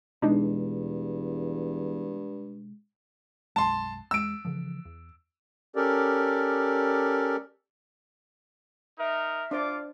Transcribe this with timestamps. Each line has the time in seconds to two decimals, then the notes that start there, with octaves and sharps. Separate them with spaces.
0.22 E2 G2 B2 G#3 D4 D#4
3.56 B1 F#2 G#3 A5 C6
4.11 E2 G#3 E6 D7
4.45 C#3 E3 F3
4.85 E2
5.76 C#4 G4 A4 A#4 D5
8.99 D#4 A#4 E5
9.51 D4 F4 C5 D5 D6